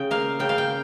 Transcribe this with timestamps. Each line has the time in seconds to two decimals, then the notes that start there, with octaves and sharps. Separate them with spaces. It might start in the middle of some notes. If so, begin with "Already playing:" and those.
Already playing: C#3 G5
0.11 A#3 F5
0.39 C#3 G5
0.49 F5
0.58 G5